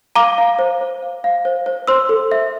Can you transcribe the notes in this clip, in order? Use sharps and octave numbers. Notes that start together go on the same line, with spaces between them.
F5 A#5 D6
F5
C5
C5
F5
F5
C5
C5
C5 C6 E6
A4
E5